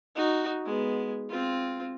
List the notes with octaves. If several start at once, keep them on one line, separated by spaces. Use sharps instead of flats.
D#4 F#4
G#3 B3
C4 F4